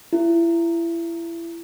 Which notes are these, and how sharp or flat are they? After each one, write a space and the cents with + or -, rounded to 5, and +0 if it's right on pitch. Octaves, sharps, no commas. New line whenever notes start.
E4 +30